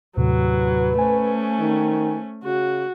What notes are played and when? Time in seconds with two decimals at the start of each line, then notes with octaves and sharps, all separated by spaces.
0.17 D#2 A2 C3 F#3 B4
0.98 A3 C#4 C5 G#5
1.60 D#3
2.44 C#3 F#4